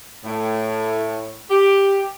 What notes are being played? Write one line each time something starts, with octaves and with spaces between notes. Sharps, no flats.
A2
G4